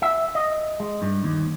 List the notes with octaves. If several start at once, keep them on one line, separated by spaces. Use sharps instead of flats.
E5
D#5
G#3
G2
D#2